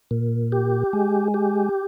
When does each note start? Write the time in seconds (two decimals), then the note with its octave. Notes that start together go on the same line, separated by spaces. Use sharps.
0.11 A#2
0.52 G4
0.93 G#3
1.34 G4